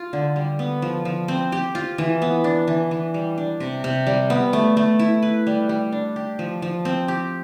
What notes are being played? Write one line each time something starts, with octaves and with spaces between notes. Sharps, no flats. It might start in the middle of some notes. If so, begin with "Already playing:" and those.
Already playing: F4
D3
G3
B3
F3
F3
C4
G4
F4
E3
B3
D4
E3
E3
G3
D4
C3
C3
G3
B3
A3
A3
E4
B4
G3
G3
D4
G4
F3
F3
C4
G4